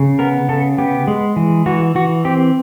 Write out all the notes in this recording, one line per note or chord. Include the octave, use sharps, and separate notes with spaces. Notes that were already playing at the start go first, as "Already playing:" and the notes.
Already playing: C#3
B3 A#4
C#3 A4
B3 G4
G#3
E3
E3 F#4
E3 F#4
C4 G4